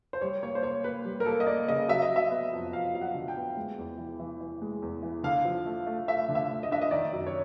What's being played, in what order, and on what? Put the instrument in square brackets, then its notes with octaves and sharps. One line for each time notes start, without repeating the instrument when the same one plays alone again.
[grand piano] C5
G3 C#5
A#3 C#5
C5
A#3 C#5
A#3 B4
G3
A#4
A#3 A4
D#5
A#3 D5
C#3 D#5
F#3 E5
D#5
F#3
E5
B3
F2
F2 F5
F#3 F5
F#5
D3
G5
B3
G#3
E2
E3
E3
E3
G#3
E2
E3
D3 F5
F3
A3
A3
A3 E5
D3
E5
A3
D#5
D4 E5
D#5
D#3 D5
F#2
C#5